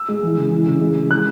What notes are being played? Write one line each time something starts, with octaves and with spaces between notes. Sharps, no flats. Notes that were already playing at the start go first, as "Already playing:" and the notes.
Already playing: E6
G#3
E3
C#3
E3
C#3
G#3
G#3
E3 F#6